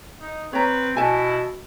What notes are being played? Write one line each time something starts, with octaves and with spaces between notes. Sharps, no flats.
D#4
C4 B4 C#5 A#5
B2 E4 G#5 A5